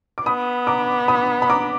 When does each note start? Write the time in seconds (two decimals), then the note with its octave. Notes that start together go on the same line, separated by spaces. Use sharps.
0.18 D6
0.26 B3 B5 D#6
0.67 A#5 D6
1.08 B5 D#6
1.42 B5
1.50 A#5 D6